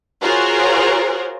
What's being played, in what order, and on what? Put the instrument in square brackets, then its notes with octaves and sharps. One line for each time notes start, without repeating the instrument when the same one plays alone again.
[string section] F4 F#4 G#4 A#4 C5 C#5